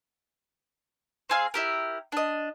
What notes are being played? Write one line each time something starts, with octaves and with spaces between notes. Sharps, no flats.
C4 G#4 F5
E4 G4 A#4
D4 D#5